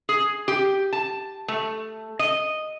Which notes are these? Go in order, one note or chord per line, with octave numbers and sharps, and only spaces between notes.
G#4
G4
A5
A3
D#5